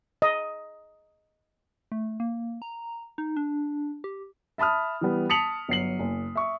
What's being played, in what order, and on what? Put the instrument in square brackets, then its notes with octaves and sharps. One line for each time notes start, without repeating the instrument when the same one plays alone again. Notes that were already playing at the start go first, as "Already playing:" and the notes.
[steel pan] D#5
[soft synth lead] A3
A#3
A#5
D#4
D4
G4
[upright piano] E5 A5 B5 D#6 F6
E3 G3 B3
A5 D#6 B6 C#7 F7 F#7
G1 F#3 C7 F#7
F#1
E5 C#6